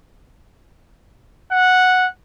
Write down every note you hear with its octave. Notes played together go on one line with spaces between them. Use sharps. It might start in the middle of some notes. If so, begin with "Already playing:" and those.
F#5